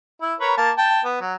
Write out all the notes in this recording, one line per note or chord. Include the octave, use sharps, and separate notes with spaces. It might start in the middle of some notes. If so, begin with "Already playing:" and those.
E4
A#4 B4 C#5
A#3 A5
G5 A5
B3
F#3